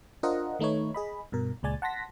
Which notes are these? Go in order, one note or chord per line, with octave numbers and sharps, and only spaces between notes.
D4 F4 A#4 C5 D#5 F#5
D#3 A3 D#4 B4 C#5
G#4 D#5 B5
G2 B2 A#4
C#2 A#2 G#3 D5 G#5 A6
F#5 A5 C6 A#6 B6